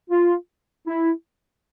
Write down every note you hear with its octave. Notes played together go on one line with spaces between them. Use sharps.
F4
E4